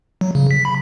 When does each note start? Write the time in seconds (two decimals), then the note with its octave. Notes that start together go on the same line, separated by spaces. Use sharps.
0.21 F#3
0.35 C#3
0.51 B6
0.65 B5